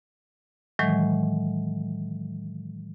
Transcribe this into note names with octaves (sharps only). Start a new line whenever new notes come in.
A2 D#3 E3 F#3 G#3